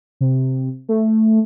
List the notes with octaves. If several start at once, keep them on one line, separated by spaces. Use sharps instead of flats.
C3
A3